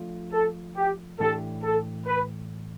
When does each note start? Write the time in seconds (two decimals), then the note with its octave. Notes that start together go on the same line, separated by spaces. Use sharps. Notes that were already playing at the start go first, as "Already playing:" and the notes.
Already playing: F3 A3 D4 F4
0.33 A4
0.77 G4
1.20 A2 E3 A3 D4 G4 A4
1.64 A4
2.07 B4